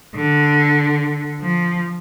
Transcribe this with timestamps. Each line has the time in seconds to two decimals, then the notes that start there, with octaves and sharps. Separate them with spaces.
0.15 D3
1.41 F3